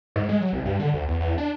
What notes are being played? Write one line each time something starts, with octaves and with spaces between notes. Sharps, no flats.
G#2
G#3
F#3
C2
G2
D3
D2
E2
E2
D4